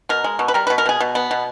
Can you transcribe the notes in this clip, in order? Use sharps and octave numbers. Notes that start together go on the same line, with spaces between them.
B2 A#4
G#3
B2
B4
G3 A#4
B2 B4
A#4
B2 G#4
B2
B3
B2